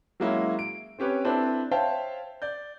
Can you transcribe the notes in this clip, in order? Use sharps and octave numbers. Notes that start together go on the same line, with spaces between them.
F#3 G#3 A#3 C#4 E4
D7
C4 C#4 G4 B4 C#5
C4 D4 E4 A4 B4
C5 C#5 E5 F5 G5 A5
D5 G6